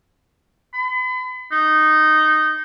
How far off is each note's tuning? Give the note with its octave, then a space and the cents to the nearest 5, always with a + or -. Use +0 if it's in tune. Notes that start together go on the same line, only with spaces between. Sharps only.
B5 +40
D#4 -10